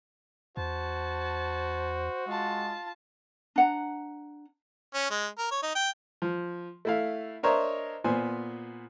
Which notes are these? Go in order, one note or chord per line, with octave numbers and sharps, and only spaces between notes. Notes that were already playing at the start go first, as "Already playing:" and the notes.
E2 F#4 C5 A5
G#3 F4 A5
D4 F#5 A#5
C#4
G#3
A#4
C#5
D#4
G5
F3
A3 E4 F5
D4 A#4 C5 C#5 D#5 E5
A#2 B3 C5 G#5